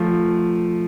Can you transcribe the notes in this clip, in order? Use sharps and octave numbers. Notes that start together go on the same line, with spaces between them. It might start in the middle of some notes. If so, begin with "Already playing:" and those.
Already playing: F3 A3